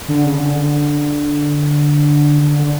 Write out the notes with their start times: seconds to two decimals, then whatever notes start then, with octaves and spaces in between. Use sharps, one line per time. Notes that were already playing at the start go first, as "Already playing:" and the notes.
0.08 D3
0.24 C#3
0.39 D3
0.55 D3
2.42 D3
2.58 D3